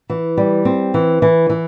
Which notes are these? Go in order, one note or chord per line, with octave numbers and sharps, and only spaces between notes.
E3
G3
C4
E3
E3
E3